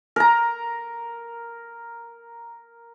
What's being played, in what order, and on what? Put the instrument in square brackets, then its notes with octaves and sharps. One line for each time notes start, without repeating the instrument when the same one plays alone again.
[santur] A#4 A#5